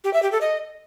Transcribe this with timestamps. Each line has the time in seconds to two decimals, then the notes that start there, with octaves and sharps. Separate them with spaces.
0.04 G4
0.13 E5
0.23 G4
0.32 A4
0.41 D#5